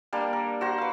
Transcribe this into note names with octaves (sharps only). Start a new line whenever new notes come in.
G3 A#3 D4
A#4
F#4 C5 A#5
B4 F5